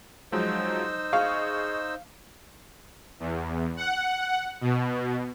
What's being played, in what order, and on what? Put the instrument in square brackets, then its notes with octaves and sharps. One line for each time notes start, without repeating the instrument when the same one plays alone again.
[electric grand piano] F3 F#3 G#3 [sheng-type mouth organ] D#4 C5 E6
[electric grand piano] G#4 D#5 C#6 [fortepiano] F5
[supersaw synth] E2
F#5
B2